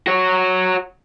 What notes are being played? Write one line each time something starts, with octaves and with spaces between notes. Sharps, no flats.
F#4 C#5